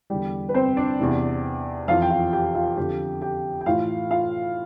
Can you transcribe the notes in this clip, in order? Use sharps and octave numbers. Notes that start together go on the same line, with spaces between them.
E2 D3 G3 G4
B4
C4 C5
D4 D5
E2 C3 E3
F2 E3 F4 F5
G5
F4 F5
G4 G5
F4 F5
F2 D3 G4 G5
G4 G5
G5
A2 E3 F4 F5
F4 F5